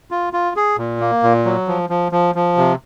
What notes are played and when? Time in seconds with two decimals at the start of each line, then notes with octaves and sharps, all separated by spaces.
0.11 F4
0.33 F4
0.56 G#4
0.78 A#2
1.00 A#3
1.23 A#2
1.45 F#3
1.68 F3
1.90 F3
2.12 F3
2.35 F3
2.57 C3